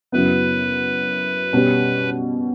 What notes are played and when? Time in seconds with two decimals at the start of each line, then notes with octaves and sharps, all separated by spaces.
0.12 F#2 C#3 F#3 B3 E4 B4
1.53 B2 G3 C#4